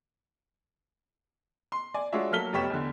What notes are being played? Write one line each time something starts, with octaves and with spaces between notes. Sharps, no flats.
C6
D5 G#5
G#3 D4 F4 F#4 C#5 E5
F#3 A#3 A4 F6 B6 G7
F1 B3 G4 C#5 B6 E7
E2 D3